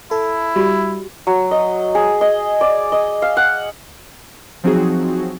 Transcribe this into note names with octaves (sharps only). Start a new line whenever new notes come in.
E4 A4
G3 F#4 G4
F#3
D#5
G#4
D#5
D5
D#5
F5
F#5
F3 F#3 C4 D#4 F#4 G#4